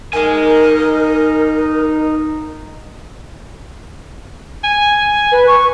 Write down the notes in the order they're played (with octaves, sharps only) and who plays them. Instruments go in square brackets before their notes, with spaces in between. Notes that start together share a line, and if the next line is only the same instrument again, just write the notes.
[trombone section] D#4 [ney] A#4 [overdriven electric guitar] D#5 G#5
[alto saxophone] G#5
[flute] B4
C#6